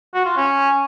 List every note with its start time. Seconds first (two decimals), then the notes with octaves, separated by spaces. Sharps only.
0.14 F#4
0.26 F4
0.37 C#4